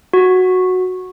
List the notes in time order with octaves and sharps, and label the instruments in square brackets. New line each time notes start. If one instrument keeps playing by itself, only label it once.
[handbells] F#4